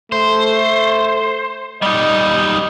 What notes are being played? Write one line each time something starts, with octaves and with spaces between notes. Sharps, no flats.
A3 C5
G3 D#4 D#5